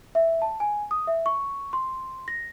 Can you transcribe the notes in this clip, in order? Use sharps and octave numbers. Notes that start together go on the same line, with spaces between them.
E5
A5
G#5
D#6
E5
C#6
C6
A#6